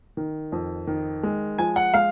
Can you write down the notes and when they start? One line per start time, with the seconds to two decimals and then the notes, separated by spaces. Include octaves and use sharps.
0.17 D#3
0.52 F2
0.87 D#3
1.23 G#3
1.58 F3 G#5
1.76 F#5
1.94 G#3 F5